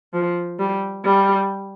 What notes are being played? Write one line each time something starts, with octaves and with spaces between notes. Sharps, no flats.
F3
G3
G3